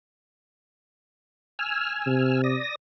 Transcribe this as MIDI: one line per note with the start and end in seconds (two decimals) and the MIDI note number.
1.59 2.42 80
1.59 2.42 88
1.59 2.42 89
2.07 2.57 48
2.44 2.75 74
2.44 2.75 87
2.44 2.75 94